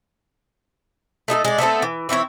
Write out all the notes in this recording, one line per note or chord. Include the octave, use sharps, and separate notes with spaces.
A3 D#4 G#4 A4
G#3 D4
A3 B3 C4 A4
E3
E3 C4 E4 C#5